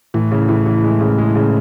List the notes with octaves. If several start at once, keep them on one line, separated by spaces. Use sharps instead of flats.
A2 E3
C#3
E3
E3
G#3
C#3
G#3
C#3